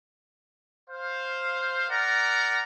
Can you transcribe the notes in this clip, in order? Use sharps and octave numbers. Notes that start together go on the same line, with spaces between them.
C5 F5
A#4 D5 F#5 A#5